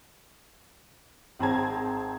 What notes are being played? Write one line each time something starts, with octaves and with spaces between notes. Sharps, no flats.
G#1 C4 G#4 A5 A#5 G#6